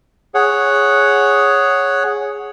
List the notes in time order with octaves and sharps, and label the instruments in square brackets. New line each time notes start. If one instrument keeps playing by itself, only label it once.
[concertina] G#4 C#5 F#5